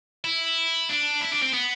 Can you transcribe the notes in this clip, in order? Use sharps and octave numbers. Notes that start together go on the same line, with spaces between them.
E4
D4
E4
D4
C4
B3